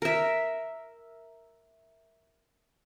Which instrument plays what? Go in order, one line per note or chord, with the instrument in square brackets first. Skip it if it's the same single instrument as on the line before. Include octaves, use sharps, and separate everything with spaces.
[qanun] A#4 E5